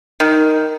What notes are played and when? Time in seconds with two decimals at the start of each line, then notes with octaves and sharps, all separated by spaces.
0.20 D#3